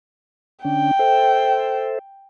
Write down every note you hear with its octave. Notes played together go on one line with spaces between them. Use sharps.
D3 C#4 D4 G5
A4 C5 E5